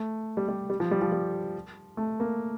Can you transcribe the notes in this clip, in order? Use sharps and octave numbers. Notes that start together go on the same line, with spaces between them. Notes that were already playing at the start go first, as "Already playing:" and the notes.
Already playing: A3
G3
G3
G3
F3
G3
F3
G3
A3
A#3